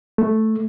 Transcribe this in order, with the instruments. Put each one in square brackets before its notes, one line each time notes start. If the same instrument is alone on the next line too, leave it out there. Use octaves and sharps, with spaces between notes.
[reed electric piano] A3